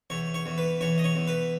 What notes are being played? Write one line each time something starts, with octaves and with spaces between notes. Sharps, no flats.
E2 C#5
C#5
E2
B4
E2 C#5
D#5
C#5
E2
B4